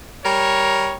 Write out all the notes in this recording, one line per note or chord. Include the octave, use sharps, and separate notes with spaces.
G3 A#4 C#5